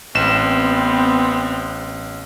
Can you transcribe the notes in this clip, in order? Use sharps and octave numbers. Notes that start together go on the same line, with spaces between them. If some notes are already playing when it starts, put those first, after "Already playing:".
A1 B3 C4 E7